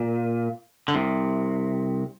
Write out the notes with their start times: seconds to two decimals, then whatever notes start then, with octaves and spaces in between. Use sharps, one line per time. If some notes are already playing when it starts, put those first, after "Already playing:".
Already playing: A#2
0.88 D3
0.95 C2 C3